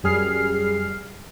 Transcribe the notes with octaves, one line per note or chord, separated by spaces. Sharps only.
F#2 G3 G#4 F6 C7